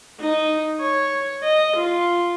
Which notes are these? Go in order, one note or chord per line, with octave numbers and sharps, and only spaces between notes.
D#4
C#5
D#5
F4